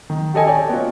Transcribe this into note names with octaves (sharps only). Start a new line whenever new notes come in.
D#3
G4 A4 D#5 G#5 A5
C#5 D5 G5
B3 C#4 F4